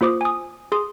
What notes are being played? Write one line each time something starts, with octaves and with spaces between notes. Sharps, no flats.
A#3 F4 C5 D6 D#6
G#5 D#6
G#4 C6 D#6